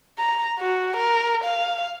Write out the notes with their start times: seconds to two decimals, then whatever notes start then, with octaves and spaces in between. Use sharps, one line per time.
0.19 A#5
0.60 F#4
0.96 A#4
1.44 F5